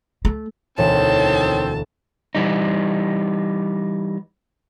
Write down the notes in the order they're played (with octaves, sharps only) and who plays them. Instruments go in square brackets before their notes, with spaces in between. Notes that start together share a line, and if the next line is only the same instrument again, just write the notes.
[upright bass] A3
[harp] E1 D2 E7 [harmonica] D#3 C4 [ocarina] C#5 [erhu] A5
[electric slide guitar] E3 G3 D#4